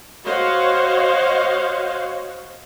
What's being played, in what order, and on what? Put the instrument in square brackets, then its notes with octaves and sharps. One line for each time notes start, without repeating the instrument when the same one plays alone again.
[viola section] F#4 C5 C#5 D#5 F5 F#5